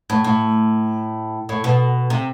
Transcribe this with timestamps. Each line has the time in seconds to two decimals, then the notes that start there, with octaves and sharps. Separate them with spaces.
0.10 A2
0.24 A2
1.49 A2
1.64 B2
2.10 C3